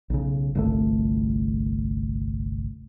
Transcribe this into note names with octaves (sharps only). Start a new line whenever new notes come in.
B1 C#3
G1 C2 A3